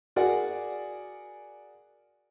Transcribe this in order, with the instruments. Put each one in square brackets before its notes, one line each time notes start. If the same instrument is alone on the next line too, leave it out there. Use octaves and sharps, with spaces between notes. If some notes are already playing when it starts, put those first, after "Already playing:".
[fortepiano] F#4 G#4 A#4 D5 F#5 G#5